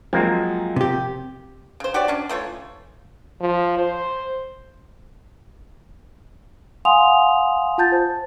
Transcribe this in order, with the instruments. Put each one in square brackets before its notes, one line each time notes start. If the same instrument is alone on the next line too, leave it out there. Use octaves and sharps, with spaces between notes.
[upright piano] F3 F#3 [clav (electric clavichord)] G#3 A#3 C4
[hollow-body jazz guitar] C3 G4
[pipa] C#3 C5
F#4 G4 C#5 D5
C#4 D4
E3 A3 F4 C#5
[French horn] F3
C5
[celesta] F5 F#5 G#5 C6 D#6 F7
F4 A5 G6 A6
C5